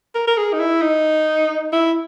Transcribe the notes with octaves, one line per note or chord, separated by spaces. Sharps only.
A#4
A#4
G#4
D#4
E4
D#4
E4